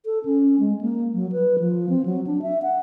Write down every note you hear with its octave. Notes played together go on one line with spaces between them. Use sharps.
A4
C#4
G#3
A#3
F#3
B4
F3
C4
F#3
D4
E5
F#5